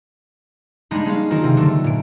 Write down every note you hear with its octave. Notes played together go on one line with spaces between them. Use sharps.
G3 G#3 A#3 D4 D#4
G#3 C#4 F5
D#3 F#3 F4 A#4
C3
D3 F#3 A3
A#2 D7